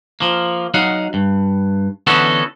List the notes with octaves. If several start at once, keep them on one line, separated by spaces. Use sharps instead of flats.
F3 A#3
F#3 D#4 F5 F#5
G2
D3 E3 B3 C#4 F#4 A4